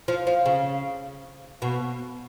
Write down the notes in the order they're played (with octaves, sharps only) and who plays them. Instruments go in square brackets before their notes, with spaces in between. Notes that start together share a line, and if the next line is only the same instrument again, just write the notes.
[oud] F3
F3
C#3
B2